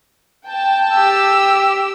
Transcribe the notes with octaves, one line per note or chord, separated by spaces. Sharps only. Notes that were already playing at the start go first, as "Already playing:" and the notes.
G5 A5
G4 E6